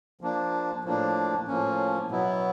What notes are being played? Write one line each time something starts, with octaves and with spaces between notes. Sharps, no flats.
F3 A#3 D4
A2 F3 A#3 D4
A2 F3 A#3 C#4
B2 F#3 B3 E4